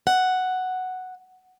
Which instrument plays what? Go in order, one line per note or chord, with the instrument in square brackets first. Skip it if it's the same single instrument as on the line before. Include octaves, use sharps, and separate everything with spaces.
[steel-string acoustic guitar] F#5